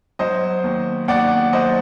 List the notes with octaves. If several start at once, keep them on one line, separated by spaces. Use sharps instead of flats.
F#3 C5 D#5
D#2
D#2 D5 F#5
F#3 C5 D#5